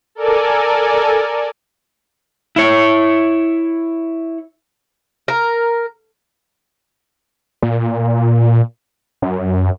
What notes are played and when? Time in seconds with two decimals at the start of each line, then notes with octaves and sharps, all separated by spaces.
0.15 A4 A#4 D5 G#5
2.56 E4 C#5
5.28 A#4
7.62 A#2
9.22 F#2